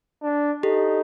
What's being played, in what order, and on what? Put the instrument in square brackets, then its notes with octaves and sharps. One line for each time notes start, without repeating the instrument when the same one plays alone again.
[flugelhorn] D4
[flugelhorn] D#4 [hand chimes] G4 A4